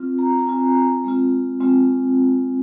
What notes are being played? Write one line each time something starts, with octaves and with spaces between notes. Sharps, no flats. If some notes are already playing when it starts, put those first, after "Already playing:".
Already playing: C4 F4
A#5
A#5
C4 F4 G#5
G#3 C4 F4
G#3 C4 F4